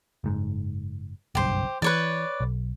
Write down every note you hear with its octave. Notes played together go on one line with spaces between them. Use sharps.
F#1 G#2
F#1 B1 G2 G4 C5
E3 B4 C#5 D5
B1